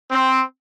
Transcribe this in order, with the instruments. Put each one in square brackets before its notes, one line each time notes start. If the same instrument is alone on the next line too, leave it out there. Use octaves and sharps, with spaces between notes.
[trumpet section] C4